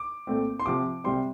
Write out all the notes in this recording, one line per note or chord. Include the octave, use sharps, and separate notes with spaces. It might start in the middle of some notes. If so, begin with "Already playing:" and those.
Already playing: D6
A#2 A3 C4
C6
C3 F3 C4 D6
C3 G3 C4 C6